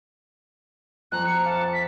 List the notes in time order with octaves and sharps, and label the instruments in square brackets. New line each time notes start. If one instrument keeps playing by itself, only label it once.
[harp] F2 A#5 [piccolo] F#6
[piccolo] C#7
[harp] F5 D6 [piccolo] A5
[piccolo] B6